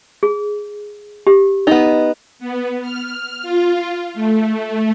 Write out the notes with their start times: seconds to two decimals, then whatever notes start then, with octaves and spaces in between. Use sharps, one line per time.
0.23 G#4
1.27 G4
1.67 B3 D#4 D#5
2.39 B3
2.82 F6
3.42 F4
4.14 A3